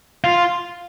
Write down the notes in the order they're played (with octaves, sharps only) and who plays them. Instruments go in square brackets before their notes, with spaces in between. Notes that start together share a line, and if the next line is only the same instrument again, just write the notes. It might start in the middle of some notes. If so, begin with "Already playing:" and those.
[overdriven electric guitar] F4